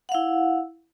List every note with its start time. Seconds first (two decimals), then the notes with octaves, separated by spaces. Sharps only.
0.09 F#5
0.12 F5
0.15 E4